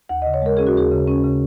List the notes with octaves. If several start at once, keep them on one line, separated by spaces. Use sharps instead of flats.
D#2 F#5
C#3 D#5
C#5
G#3 A#4
C#4 G#4
F#4
D#2 G#4
C#3
C#4
C#3